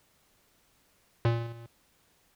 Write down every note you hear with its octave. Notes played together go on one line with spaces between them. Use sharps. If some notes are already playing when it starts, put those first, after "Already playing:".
A#2